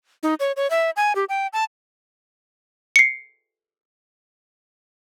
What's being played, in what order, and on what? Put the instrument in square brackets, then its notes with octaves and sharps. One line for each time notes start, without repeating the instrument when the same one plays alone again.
[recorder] D#4
C#5
C#5
E5
G#5
G4
G5
A5
[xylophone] C7 C#7